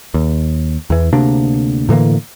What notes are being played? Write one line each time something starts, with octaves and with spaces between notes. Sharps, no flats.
D#2
E2 E3
D2 C3 A#3 D4
A2 D3 E3 A#3